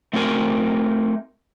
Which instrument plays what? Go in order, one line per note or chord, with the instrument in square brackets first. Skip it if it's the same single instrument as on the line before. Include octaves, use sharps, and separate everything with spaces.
[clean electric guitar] A3 C4 D#4 F#4 A#4 G#5